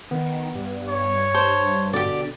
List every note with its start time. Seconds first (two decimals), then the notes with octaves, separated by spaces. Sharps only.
0.11 D#3 B3
0.55 G2
0.88 C#5
1.35 C5 A5
1.93 B2 D3 G4 D5